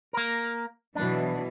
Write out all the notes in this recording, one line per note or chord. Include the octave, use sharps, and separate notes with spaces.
A#3 A#4
B2 E3 F#3 D4